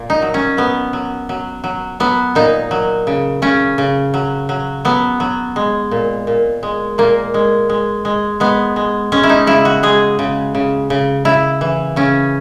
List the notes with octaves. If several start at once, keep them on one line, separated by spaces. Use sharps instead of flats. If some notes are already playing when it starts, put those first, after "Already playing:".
Already playing: A#2
D#4
F#3
C#4
F#3 B3
F#3
F#3
F#3
F#3 B3
A#2 D#4
F#3
C#3
C#3 C#4
C#3
F#3
F#3
F#3 B3
F#3
G#3
A#2
A#2
G#3
A#2 A#3
G#3
G#3
G#3
G#3 B3
G#3
G#3 C#4
E4
D#4
C#3 E4
F#4
G#3 G#4
C#3
C#3
C#3
C#3 E4
E3
C#3 C#4